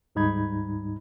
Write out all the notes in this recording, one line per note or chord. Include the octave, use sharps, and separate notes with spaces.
D2 G#2 G3 D#4 B5 G#6